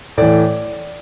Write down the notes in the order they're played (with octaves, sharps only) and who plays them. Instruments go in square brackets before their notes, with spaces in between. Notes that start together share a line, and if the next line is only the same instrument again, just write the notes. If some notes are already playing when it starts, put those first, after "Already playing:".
[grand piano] A2 E3 D5